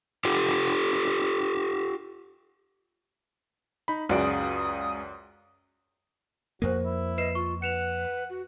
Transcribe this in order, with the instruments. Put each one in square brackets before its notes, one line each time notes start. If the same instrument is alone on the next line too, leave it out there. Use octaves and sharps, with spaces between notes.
[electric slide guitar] F4 G4 A4
[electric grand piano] D#4 B5
[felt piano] C#2 F#4 G#4 [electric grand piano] F#2 D5 D7 [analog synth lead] D#6
[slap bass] F2 A#3 [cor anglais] F#4 [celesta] A#4 C5
[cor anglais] E4
[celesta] B4 C7 E7 [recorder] D#5
[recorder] F4 [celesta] C#6
[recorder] B4 [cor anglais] F#5 [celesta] C#7 E7 F7
[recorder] F#4